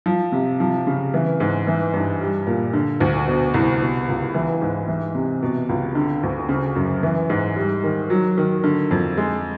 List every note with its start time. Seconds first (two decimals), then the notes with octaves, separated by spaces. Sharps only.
0.06 F3
0.32 C3
0.60 F3
0.87 C#3
1.14 E3
1.40 G#2
1.67 E3
1.93 G2
2.21 G3
2.47 A#2
2.73 D3
3.00 D2
3.27 B2
3.54 C2
3.82 B2
4.08 C#2
4.34 E3
4.61 G#2
4.88 E3
5.15 C3
5.43 B2
5.69 C#2
5.95 D3
6.23 D2
6.49 C#3
6.76 F#2
7.03 E3
7.30 G#2
7.56 G3
7.84 D#3
8.10 F#3
8.38 D#3
8.64 D3
8.91 F2
9.17 G#3